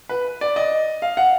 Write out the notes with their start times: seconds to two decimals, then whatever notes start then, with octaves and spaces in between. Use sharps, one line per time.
0.09 B4
0.41 D5
0.56 D#5
1.02 F5
1.17 F#5